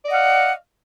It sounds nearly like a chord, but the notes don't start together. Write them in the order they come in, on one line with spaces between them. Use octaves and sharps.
D5 D#5 F#5 F5